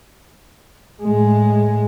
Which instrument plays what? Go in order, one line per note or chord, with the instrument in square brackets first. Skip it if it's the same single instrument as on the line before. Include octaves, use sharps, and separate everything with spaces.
[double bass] A2 G#3